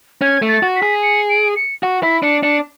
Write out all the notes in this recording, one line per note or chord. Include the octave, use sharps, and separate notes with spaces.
C#4 G#6
A3
A6
F#4
B6
G#4
C#7
D7
C#7
F#4
E4 B6
D4 C#7
D4 C#7